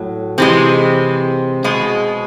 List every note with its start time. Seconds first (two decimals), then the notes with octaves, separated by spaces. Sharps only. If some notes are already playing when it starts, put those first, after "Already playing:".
Already playing: A2 F#3
0.38 C3 E3 G#3 C4
1.64 B2 G#3